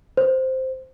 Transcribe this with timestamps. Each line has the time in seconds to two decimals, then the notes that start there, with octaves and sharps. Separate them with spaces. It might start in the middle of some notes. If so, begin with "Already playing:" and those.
0.17 C5